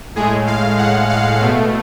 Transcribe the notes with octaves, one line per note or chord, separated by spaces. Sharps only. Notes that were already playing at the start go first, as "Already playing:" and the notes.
A2 G#3 G#4
F5
F#5
F5
B2 A3